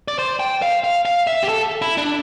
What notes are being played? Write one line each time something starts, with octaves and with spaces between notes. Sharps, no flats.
D5
C5
G5
F5
F5
F5
E5
G4
A4
E4
D4